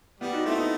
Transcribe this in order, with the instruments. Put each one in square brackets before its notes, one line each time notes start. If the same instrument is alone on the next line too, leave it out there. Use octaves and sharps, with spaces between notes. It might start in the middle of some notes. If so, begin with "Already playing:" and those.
[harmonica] G3 [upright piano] B3
[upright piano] D#4 F#4
[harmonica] A3 [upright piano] C4 E4
[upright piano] B3 D#4